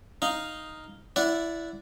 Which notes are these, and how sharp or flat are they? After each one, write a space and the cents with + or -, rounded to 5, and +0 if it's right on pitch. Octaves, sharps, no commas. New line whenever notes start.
D#4 +0 F5 +0
E4 +10 D5 -10 F#5 -15